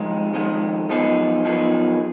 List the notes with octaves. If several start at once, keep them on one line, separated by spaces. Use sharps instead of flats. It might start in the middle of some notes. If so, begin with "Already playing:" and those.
Already playing: F2 D#3 G#3
F2 D#3 G#3
F#2 F3 B3 D#4 G#4
F#2 F3 B3 D#4 G#4